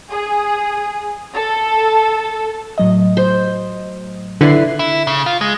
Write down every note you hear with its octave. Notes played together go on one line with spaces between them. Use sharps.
G#4
A4
A2 F#3 D#5
C5
D3 E4 B4 D5 C7
E4
C#3
F4
G#3